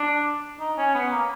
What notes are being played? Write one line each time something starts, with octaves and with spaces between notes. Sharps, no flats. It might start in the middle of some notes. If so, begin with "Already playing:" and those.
Already playing: D4
D#4
C#4
B3
A#3